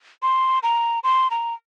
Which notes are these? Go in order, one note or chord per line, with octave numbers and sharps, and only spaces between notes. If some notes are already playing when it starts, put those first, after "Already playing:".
C6
A#5
C6
A#5